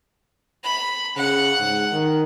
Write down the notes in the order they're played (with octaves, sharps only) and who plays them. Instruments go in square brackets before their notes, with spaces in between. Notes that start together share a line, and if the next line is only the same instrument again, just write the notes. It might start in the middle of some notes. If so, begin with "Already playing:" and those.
[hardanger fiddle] B5
[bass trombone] C#3 [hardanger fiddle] F#5
[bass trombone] G#2
D#3